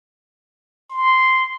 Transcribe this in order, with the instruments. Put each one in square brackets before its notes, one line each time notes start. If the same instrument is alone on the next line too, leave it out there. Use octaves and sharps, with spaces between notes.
[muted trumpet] C6